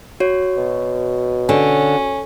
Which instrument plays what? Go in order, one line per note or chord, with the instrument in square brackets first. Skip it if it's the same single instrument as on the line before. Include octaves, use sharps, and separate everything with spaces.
[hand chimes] F#4 C#5
[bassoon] B2
[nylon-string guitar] D3 [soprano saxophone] C#4